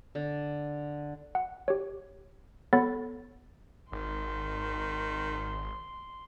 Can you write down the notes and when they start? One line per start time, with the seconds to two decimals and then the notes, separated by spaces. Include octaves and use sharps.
0.15 D3
1.35 F#5
1.68 G4 C#5
2.73 B3 A4 C#5 F#5 B5 A6
3.92 G#1 D#3 C6